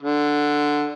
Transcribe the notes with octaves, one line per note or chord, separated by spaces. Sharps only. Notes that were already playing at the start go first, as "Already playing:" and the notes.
D3